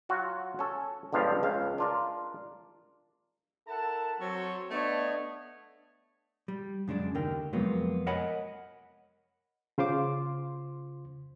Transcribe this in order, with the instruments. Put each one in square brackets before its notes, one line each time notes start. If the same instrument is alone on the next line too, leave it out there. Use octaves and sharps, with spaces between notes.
[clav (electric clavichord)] F#3 F4 F#4
C#4 A4
G1 C#2 G2 F3 F5
C#2 F5
D4 F4 A#4
[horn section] E4 A4 A#4 F#5 A5
F#3 C4 A4
A3 B3 D4 C#5 D#5
[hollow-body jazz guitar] G3
F#2 C#3 G#3 D4
D#2 D3 D#4 A#4 G5
F2 C3 F#3 G#3 A#3 B3
A#4 C#5 D#5 F#5 G#5 B5
[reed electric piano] C#3 F4 C5 C6 D6